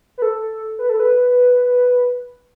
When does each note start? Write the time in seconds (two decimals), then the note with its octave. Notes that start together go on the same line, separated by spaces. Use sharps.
0.18 B4
0.22 A4
0.79 B4
0.89 A4
1.00 B4